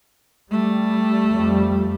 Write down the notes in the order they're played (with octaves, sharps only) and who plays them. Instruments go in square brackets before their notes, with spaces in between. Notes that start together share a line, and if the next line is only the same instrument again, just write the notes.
[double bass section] G3 [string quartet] A3
[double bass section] F2 G3